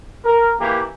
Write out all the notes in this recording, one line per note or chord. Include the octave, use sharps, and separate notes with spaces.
A#4
E3 A#3 G4